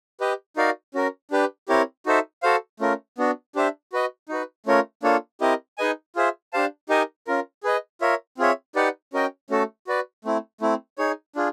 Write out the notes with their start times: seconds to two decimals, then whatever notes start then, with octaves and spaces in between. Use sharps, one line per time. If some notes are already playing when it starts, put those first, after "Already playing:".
0.20 G4 B4 D#5
0.57 D#4 F#4 A#4 D5 F5
0.94 C#4 F#4 A#4
1.31 D4 G4 B4
1.68 C4 E4 G4 A#4 C#5
2.06 D#4 F#4 A4 C5 E5
2.43 F#4 A4 C5 F5
2.80 A3 C#4 F4 A#4
3.18 B3 D4 F#4
3.55 D4 G4 C5 E5
3.93 F#4 B4 D#5
4.29 D#4 F#4 B4
4.66 A3 C#4 F4 A#4 C#5
5.03 A#3 D4 F4 A4 C#5
5.41 C4 E4 G4 A#4 D#5
5.78 D#4 G#4 B4 D#5 G#5
6.16 F4 G#4 C5 E5
6.53 D4 G4 C5 F5 A5
6.89 D#4 G4 A#4 D#5 G#5
7.27 C#4 F4 A#4
7.63 G#4 B4 D#5
8.01 F4 A#4 C#5 E5
8.38 C4 F4 G#4 C#5 E5
8.75 D#4 G4 B4 D5 F#5
9.13 C#4 F#4 A#4 D#5 G5
9.50 A3 C#4 F#4 A4
9.87 F#4 B4 D5
10.25 A3 C4 E4
10.61 A3 C4 E4
10.98 D#4 G#4 C#5
11.36 D4 F4 G#4